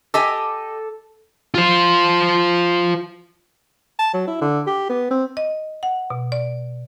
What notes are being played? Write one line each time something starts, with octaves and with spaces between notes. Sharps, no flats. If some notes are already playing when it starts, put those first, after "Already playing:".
G4 A4 D#5 G#5
F4 C5
A5
F#3
E4
D3
G4
B3
C4
D#5
F#5
B2
D5